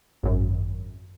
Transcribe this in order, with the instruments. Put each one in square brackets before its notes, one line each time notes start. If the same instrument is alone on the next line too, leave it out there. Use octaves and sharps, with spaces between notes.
[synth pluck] G#1 F#2